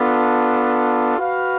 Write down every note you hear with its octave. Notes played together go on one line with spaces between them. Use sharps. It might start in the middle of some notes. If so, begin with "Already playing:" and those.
Already playing: B3 D4 F4 A4
F#4 B4 F5